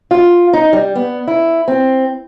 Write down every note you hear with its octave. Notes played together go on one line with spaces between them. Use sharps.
F4
D#4
G3
B3
E4
C4